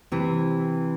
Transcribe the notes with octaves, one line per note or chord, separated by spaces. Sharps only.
C3 E3